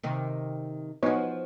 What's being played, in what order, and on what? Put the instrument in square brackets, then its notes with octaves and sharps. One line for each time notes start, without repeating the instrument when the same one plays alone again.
[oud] C3 D#3
[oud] F3 F#4 [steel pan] B3 D#4 C#5